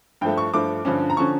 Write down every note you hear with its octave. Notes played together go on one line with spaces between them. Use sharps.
G2 F3 A3 G5
C#6
G2 F3 A3 D6
G2 D3 F3 C#4
A#5
D3 F3 C#4 C#6